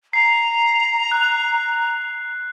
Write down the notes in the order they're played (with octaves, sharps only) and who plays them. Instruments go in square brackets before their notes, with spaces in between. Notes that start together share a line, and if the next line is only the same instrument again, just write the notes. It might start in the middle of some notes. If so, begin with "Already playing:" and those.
[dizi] A#5 [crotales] C7
[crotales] F#6